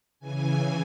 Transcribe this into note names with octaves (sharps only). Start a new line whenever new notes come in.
C#3 E3 G#5